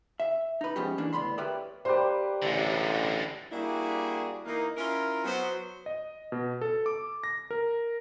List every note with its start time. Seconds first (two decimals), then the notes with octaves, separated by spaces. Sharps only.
0.20 E5
0.61 D#4 B4
0.76 G#2 F3 G#3 B3 C#4 G4
0.98 E3 A#3 D4
1.13 D2 A2 D#3 B3 B5 C6
1.38 G4 A#4 B4 C#5 D5 E5
1.85 G3 A#3 G4 B4 C5
2.43 A1 D3 G#3
3.52 G3 A#3 D4 E4 F#4 G#4
4.46 E3 A#3 D#4
4.77 C#4 E4 F4 A#4
5.24 F#3 B3 C5
5.86 D#5
6.32 B2
6.61 A4
6.86 D6
7.24 A#6
7.51 A#4